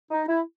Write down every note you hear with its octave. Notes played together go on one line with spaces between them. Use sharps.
D#4
E4